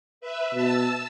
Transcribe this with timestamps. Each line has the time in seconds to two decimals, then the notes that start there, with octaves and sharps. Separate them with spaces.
0.21 B4 E5
0.53 B2 A5 E6